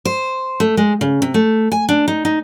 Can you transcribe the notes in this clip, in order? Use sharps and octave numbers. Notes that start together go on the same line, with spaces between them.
C5
A3
G#3
C#3
C3
A3
G#5
D4
D#4
D#4